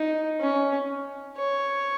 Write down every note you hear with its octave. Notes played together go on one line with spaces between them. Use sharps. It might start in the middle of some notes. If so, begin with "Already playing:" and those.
Already playing: D#4
C#4
C#5